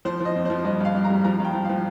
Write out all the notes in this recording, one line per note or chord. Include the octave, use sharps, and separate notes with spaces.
F3 C5
F3 D#5
F2
F3 C5
G2 D#5
G2 F5
G2
A#5
G3
F3 A#5
G2 G5
F3
F3 F5